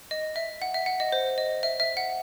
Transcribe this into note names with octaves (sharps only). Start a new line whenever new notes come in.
D#5
E5
F#5
E5
F#5
D#5
C5
D#5
E5
E5
F#5